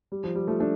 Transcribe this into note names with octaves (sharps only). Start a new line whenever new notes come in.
G3
F3
G3
F3 A3
A3 D4